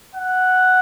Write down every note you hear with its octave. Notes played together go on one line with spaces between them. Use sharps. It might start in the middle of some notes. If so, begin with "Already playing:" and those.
F#5